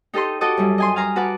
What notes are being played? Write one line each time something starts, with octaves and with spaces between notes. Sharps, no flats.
D#4 G4 A4 D#5 C6
F#4 A4 D#5 A5 D6 D#6
F#2 G3 E4
D#5 G#5 C6
F5 G#5 A#5 C6
F#4 B4 F#5 A5 D6